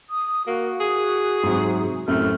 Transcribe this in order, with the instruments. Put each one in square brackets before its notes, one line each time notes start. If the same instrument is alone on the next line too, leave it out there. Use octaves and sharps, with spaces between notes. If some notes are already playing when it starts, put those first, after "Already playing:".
[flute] D#6
[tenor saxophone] A#3 [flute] F#4
[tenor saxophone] G#4
[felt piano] G#2 C3 F#3
[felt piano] F#2 A2 C3 [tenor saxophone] A3 [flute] F6